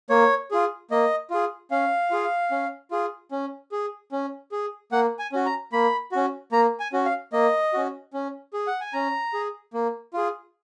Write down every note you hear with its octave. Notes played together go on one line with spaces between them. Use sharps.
A#3 C#5
F4 G#4
A#3 D#5
F4 G#4
C#4 F5
F4 G#4
C#4
F4 G#4
C#4
G#4
C#4
G#4
A#3 F#5
G#5
C#4 F#4
A#5
A#3 B5
C#4 F#4
A#3 A#5
G#5
C#4 F#4
F5
A#3 D#5
C#4 F#4
C#4
G#4
F#5
G#5
C#4 A#5
G#4
A#3
F4 G#4